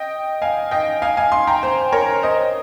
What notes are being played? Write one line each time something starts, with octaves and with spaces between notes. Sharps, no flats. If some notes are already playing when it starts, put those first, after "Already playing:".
Already playing: D#5 G5
F5 G#5
D#5 G5
F5 G#5
F5 G#5
G#5 C6
G5 A#5
C5
A#4 C#5
C5 D#5